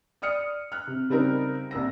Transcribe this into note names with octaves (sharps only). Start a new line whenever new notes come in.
D5 D#6 F6 C#7
F6 F#6
C3
C#3 G3 C4 D#4 A#4
C2 A#3 E6 A#6